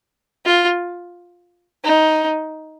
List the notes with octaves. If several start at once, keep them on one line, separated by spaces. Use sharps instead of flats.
F4
D#4